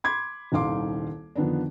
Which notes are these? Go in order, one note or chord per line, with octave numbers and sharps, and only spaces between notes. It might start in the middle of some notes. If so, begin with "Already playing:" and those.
B5 C6 D6 G#6
D#1 C2 D#3 F5 C6 D6
F2 D3 D#3 B3 D4